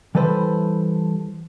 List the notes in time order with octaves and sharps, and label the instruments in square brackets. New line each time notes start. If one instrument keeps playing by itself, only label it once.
[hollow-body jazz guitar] E3 G3 A4 B4 C5